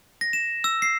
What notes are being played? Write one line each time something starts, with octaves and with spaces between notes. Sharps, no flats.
A#6
E7
E6
C7